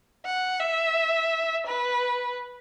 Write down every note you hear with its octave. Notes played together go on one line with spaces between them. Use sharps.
F#5
E5
B4